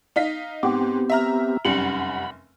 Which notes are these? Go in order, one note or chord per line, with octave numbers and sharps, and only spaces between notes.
D#4 F5 B6
G#2 B3 C4 G4
E5 A#5 F6
F1 F#2 G3 F#5 B5